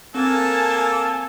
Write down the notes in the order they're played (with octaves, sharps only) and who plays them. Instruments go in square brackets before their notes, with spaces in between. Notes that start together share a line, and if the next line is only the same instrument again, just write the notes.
[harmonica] A#3 A4 [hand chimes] C4 [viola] G#5 A5